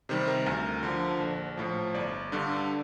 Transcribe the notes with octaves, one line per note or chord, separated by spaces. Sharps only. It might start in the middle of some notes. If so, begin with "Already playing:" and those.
C3 D#3 G3 C5
A#4
D2 A#4
D3 F3
A#1
A2 F3
G1 D5
G2 D3